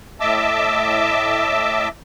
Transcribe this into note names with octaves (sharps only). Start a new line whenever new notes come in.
A2 D#5 E5 A5 D6 E6